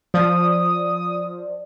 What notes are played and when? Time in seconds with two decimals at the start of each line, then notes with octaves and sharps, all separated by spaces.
0.14 F3 D5 D#6